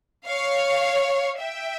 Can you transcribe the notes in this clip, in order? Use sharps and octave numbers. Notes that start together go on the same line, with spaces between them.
C#5 F5
E5 G5